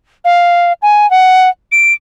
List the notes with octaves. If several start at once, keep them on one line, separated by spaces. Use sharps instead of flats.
F5
G#5
F#5
D7